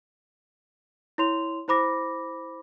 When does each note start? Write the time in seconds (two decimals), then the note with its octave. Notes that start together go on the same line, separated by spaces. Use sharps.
1.18 E4 C#5 C6 F7
1.68 E4 C5 B5 D6 A#6